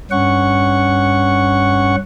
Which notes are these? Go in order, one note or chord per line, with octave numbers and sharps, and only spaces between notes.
G2 C#4 F#5 C#6